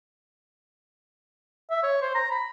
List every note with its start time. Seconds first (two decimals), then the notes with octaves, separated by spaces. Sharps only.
1.70 E5
1.83 C#5
2.02 C5
2.15 A#5
2.31 B5